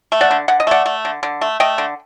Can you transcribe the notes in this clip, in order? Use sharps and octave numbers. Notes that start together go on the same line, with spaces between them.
A3
D5 F#5
D3
D3 F#5
D#5
A3 D5 F#5
A3
D3
D3
A3
A3 D#5 G5
D3